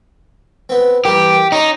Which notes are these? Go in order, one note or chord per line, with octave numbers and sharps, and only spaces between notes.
B3 C4
E3 G3 A#3 G4
C#4 D#4 C#5 D6